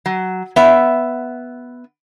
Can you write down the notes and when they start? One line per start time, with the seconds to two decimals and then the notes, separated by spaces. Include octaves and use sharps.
0.06 F#3
0.56 B3 E5